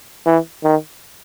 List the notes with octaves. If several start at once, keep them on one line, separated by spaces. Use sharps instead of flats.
E3
D#3